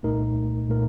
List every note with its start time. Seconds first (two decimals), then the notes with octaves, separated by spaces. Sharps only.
0.03 C2 A#2 A3 D#4 A#4
0.69 A#2 A3 D#4 A#4